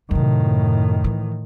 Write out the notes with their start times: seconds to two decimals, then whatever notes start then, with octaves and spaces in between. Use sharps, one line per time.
0.11 F#2 A2 C3 D#3
1.04 E3